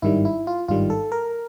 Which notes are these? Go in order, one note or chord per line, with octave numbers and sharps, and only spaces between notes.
G#1 G2 D#3 G3 E4
E4
F4
G#1 G2 D#3 G3 F4
A4
A#4